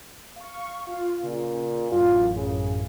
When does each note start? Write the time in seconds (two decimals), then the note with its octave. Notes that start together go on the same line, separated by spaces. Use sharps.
0.36 F5 C#6
0.86 F4 F5
1.23 A#2 C#3
1.92 A1 F#2 A2 F4
2.35 C#3